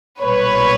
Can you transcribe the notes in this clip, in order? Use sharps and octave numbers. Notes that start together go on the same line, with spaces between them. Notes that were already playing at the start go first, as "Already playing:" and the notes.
B1 A#2 G3 B4 C#5